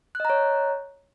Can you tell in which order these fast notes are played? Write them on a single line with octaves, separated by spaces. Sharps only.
F#6 D#5 A#5 C#5